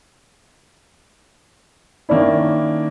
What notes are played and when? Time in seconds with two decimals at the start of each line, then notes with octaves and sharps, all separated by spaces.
2.09 D#3 A#3 C#4 D4 E4